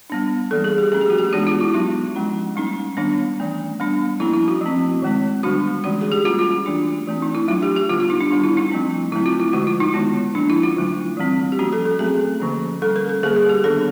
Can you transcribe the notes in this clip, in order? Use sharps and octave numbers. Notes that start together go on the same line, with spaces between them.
G3 B3 D4
E3 G3 A#3 A4
G#4
G4
F3 A3 C#4 G#4
G4
F#4
G4
E3 G#3 B3 D4 F#4
F4
E4
F#3 B3 D4 D#4
F3 G#3 C#4
G3 A#3 C#4 D#4
D#3 G3 B3 D4
E3 A3 C#4
G3 B3 D4
F3 A#3 C#4 E4
E4
F#4
F3 A3 C4
D#3 G#3 C4
D3 G3 B3 D4 F#4
E3 G#3 C#4 F#4
G#4
G4
G3 A#3 C#4 F4
F4
E3 A3 D4
E3 A3 C4
D#4
E4
F#3 A3 D4 F4
G4
G4
D3 G3 B3 F4
F4
D#4
D4
D#3 G3 B3 D4 D#4
E4
D#4
F3 A3 C4
D3 F#3 A3 C4 E4
F4
E4
D3 F3 G#3 F#4
F4
D#4
D#3 G#3 B3
F3 A#3 C#4 D4
E4
F4
D3 F#3 A3
E3 G3 C4
G4
F3 A#3 C#4 F#4
A4
A4
F#3 A3 C4 G#4
D3 F3 A#3 C#4
G3 A#3 C#4 A4
A#4
A4
D3 G3 A#3 G#4
G#4
G4
D#3 G3 B3 D4 A4